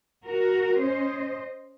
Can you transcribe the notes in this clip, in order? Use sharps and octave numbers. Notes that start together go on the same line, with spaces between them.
F#4 A#4
C#4 C5 D#5